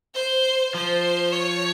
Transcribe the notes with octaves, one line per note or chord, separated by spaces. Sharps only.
C5
F3 C5
C#5